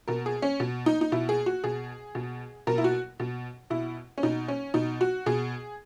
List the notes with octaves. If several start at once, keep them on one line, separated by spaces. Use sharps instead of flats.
B2 A#4
G#4
C#4
B2
D#4
D#4
B2 E4
G#4
F#4
B2 G#4
B2
B2 A#4
E4
F#4
B2
B2 E4
C#4
B2 D#4
C#4
B2 D#4
F#4
B2 G#4